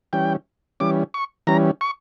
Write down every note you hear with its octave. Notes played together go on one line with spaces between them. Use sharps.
E3 G3 C#4 G5
E3 G3 C#4 D6
C#6
E3 G3 C#4 A#5
C#6